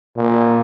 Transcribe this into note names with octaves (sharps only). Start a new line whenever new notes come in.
A#2